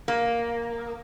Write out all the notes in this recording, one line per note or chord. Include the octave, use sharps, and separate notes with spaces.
A#3